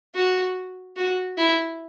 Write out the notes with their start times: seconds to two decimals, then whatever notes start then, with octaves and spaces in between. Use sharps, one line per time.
0.14 F#4
0.96 F#4
1.37 E4